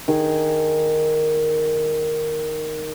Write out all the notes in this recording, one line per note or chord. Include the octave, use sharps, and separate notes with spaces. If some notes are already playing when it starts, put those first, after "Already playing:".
D#3 G#4